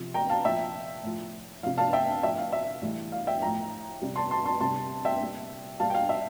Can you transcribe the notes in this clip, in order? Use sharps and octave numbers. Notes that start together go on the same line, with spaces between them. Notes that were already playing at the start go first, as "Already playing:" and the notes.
Already playing: C3 F3
G5 A#5
F5 A5
A#2 F3 E5 G5
A2 F3
C3 F3 F5
F5 A5
E5 G5
A2 F3 E5 G5
F5
E5
A2 E3 G3
F5
E5 G5
A2 F3 G5 A#5
C3 G3
A5 C6
A5 C6
A5 C6
C3 G3 A5 C6
E5 G5
A#2 G3
A#2 G3 F5 A5
G5
F5
E5